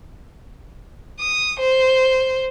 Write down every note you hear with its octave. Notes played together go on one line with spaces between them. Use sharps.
D#6
C5